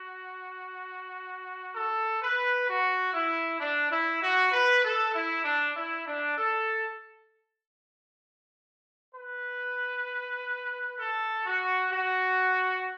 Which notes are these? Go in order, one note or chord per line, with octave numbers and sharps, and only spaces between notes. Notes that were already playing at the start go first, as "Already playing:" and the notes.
Already playing: F#4
A4
B4
F#4
E4
D4
E4
F#4
B4
A4
E4
D4
E4
D4
A4
B4
A4
F#4
F#4